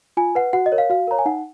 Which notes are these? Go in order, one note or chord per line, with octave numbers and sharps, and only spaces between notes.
F4 G#5
B4 F#5
F#4 F#5
D#5
A#4 C#5
F5
F#4 F5
A#4 C#5 A#5
G#5
D#4 F#5